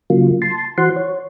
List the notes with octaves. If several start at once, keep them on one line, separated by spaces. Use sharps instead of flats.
C#3 F#3 A#3 F4
A5 C6
E3 F#4 C5 F#5 C6
C#5